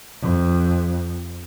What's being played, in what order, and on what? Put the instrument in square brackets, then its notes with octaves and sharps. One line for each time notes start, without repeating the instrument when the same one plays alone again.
[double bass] F2